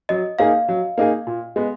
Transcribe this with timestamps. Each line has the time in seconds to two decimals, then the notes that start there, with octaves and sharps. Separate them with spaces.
0.09 F#3 D#5
0.39 A#3 D#4 G#4 F5
0.68 F#3
0.98 A#3 D#4 G#4
1.27 A#2
1.56 G#3 B3